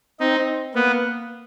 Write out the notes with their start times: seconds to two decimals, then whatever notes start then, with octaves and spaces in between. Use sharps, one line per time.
0.20 C4 D#4
0.75 A#3 B3